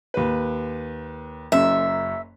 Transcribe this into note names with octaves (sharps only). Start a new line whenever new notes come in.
D#2 B4
F#1 F#2 E5